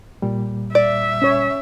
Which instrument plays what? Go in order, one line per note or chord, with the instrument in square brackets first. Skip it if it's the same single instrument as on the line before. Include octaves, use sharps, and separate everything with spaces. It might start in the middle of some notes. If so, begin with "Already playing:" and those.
[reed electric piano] A#2 G3
[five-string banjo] D5 [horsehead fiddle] E5
[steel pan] C#4 C#5